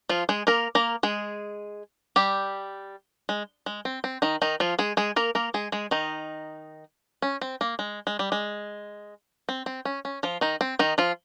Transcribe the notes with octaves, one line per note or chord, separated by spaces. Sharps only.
F3 F4
G#3 G#4
A#3 A#4
A#3 A#4
G#3 G#4
G3 G4
G#3
G#3
C4
C4
D#3 D#4
D#3 D#4
F3 F4
G#3 G#4
G#3 G#4
A#3 A#4
A#3 A#4
G#3 G#4
G#3 G#4
D#3 D#4
C#4
C4
A#3
G#3
G#3
G3
G#3
C4
C4
C#4
C#4
F3 F4
D#3 D#4
C4
D#3 D#4
F3 F4